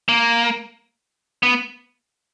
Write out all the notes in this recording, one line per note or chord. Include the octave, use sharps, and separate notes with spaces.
A#3
B3